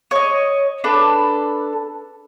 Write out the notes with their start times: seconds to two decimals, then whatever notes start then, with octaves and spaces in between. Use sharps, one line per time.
0.11 C#5 D#5
0.84 D4 A4 B4